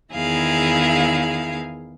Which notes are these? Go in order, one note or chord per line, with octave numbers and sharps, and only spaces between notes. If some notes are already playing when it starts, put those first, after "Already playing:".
E2 D#3 E4 G#4 F5